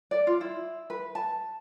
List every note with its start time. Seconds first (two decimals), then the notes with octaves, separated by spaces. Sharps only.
0.11 D5
0.27 F4
0.41 E4
0.90 B4
1.15 A5